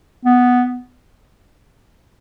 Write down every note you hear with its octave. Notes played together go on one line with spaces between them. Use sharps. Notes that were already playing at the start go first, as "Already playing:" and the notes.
B3